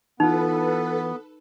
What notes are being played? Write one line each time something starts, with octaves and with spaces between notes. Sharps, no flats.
E3 B3 D#4 F4 A4 B4